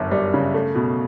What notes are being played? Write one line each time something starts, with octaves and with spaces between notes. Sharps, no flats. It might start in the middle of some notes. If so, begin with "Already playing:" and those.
Already playing: G1 F#2
G3
C#3
A3
B2